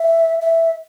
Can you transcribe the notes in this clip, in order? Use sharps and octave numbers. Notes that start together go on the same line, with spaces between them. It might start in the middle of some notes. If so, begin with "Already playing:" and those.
Already playing: E5
E5